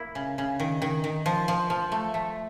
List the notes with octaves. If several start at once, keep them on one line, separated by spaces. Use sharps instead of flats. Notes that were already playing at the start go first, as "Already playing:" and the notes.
Already playing: A#3 E4
C#3
C#3
D#3
D#3
D#3
F3
F3
F3
A3
A3